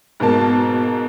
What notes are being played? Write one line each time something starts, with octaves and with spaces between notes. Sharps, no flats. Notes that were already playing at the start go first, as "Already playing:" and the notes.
G#2 B2 A#3 A5